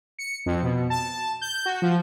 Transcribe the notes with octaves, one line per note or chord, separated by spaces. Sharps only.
C#7
F2
B2
A5
G6
F#4
F3